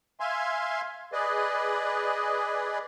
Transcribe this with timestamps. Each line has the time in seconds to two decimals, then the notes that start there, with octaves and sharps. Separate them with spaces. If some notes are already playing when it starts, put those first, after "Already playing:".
0.20 E5 F5 G#5 C6
1.13 G#4 B4 D5 D#5